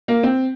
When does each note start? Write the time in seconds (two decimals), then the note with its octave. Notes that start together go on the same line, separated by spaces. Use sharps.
0.08 A#3
0.23 C4